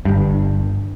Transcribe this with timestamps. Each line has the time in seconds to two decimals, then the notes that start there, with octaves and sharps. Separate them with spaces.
0.05 G1 G2